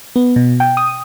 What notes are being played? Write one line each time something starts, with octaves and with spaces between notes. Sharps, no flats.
B3
B2
G5
D#6